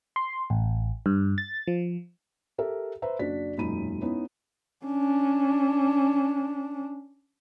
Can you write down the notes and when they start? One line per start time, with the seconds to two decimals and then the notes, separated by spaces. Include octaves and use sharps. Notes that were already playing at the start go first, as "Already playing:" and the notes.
0.16 C6
0.50 A1
1.06 G2
1.38 A6
1.67 F3
2.58 G4 A4 A#4 E5
3.02 B4 C5 E5 A#5
3.19 F#1 D4 F#4 B6
3.57 E1 F#2 A#2 D#4 B5 D#7
4.02 B3 C#4 D#4 E4
4.86 C#4 D4